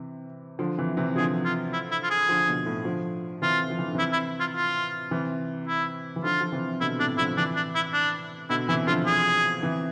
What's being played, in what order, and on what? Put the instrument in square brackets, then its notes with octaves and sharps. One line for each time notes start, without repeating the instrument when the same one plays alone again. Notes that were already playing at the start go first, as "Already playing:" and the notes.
Already playing: [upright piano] C3 E3
D3 F3
C3 E3
C3 E3
[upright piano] D3 F3 [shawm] G#4
[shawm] F4
E4
E4
F4
G#4
[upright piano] D3 F3
B2 D3
A2
D3 F3
[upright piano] C3 E3 [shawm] F4
[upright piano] F3
E3
D3
[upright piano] C3 E3 [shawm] E4
[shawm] E4
F4
F4
[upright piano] C3 E3
[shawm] E4
[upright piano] E3
[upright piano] D3 F3 [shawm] F4
[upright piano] F3
C3 E3
[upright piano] B2 D3 [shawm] E4
[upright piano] A2 C3 [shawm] D4
[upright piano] D3 F3 [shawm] E4
[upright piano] C3 E3 [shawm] D4
[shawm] D4
E4
D4
[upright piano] B2 D3 [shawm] E4
[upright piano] C3 E3 [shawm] E4
[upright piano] D3 F3 [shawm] F4
[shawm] G#4
[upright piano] C3 E3